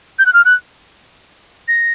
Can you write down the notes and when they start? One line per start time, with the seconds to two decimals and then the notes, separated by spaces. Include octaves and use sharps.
0.19 G6
0.26 F#6
0.33 F6
0.45 F#6
1.68 A#6